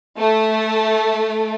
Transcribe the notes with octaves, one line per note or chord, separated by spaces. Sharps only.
A3